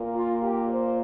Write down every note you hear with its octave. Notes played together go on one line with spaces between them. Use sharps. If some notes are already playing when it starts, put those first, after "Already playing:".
Already playing: A#2 A#3
F4
G4
C5